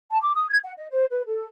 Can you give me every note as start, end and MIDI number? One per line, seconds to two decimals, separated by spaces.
0.11 0.18 81
0.22 0.32 86
0.35 0.47 87
0.50 0.58 92
0.64 0.72 78
0.77 0.86 75
0.91 1.04 72
1.11 1.22 71
1.26 1.46 69